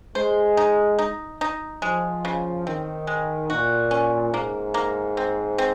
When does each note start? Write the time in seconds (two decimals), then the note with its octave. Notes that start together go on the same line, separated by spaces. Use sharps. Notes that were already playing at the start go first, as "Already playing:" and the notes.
0.15 G#3 C5
0.57 D#4
0.99 D#4
1.41 D#4
1.82 F3 G#3
2.25 C#3
2.66 D#3 C4
3.07 G#3
3.50 A#2 F#4
3.91 C#4
4.33 G#2 A#3
4.74 A#3
5.17 C4
5.58 C4